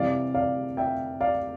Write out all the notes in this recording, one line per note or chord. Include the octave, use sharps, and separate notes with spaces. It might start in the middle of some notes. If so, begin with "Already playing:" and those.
Already playing: C3 E3 G3 D5 F5
D5 F5
E5 G5
D5 F5